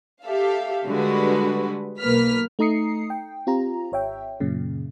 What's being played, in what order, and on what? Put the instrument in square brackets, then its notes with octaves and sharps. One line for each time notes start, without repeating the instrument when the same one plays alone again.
[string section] G4 A4 E5 F5
D3 G3 G#3 F#4 B4
B1 A#3 B4 F6 B6
[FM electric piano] A3 D#4 A#5 D#6 C7 C#7
G5
C4 F4 G4 A#5
G#1 C#5 E5 G5
F#2 A#2 C#3